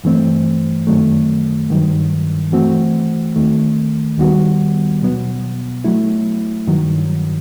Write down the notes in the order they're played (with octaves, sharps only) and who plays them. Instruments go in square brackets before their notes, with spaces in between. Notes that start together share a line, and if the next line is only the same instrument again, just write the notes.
[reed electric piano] G2 E3 A3 C4
F#2 D#3 F#3 A3
G2 D#3 F#3
E3 A3 C4 F#4
D#2 D#3 A3
D#2 D#3 G3 B3 F#4
B2 F#3 B3
F#3 A3 E4
G2 D#3 F#3